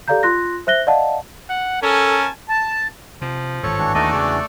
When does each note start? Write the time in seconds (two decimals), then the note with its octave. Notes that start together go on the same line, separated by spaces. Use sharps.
0.08 G4 A4 D5 F5 A#5 G6
0.23 F4 C6 F#6 A#6
0.67 C5 E5 F#6 A#6 G7
0.87 D5 D#5 F5 F#5 A5
1.49 F#5
1.82 C#4 A4 A#4 G#5 A5
2.49 A5
3.22 C3 F3
3.63 G#1 G2 A4 C#5
3.78 E3 D4 F#4
3.95 D#2 A3 D#4 A4 D5
4.13 E2 C#3 G#3